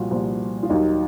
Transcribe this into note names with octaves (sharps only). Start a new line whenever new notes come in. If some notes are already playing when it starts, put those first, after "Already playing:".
Already playing: C2 A#2 F3 F4 F#4
C2 A#2 F3
F4
D#2 D#3 F#3 D#4